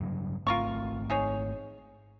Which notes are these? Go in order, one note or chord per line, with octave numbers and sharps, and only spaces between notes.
G2 C#3 F#3
G#1 A3 C4 F4 A#4 C#6
D#4 G#4 C#5